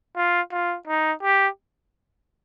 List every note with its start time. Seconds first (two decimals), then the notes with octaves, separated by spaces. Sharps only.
0.16 F4
0.52 F4
0.87 D#4
1.23 G4